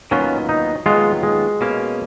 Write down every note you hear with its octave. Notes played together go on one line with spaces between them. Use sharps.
D#2 D#3 F#3 B3 C#4 F4
D#4
D#2 D#3 F#3 G#3 B3 F4
G#3
B2 A#3 C#4